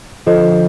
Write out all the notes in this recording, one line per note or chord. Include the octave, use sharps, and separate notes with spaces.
D3 F3 F4 A4 C5 D#5